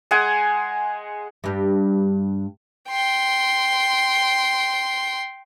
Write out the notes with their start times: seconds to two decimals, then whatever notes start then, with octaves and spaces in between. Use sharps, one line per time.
0.11 G#3 F#5 G#5
1.44 G2 G3
2.89 G5 C6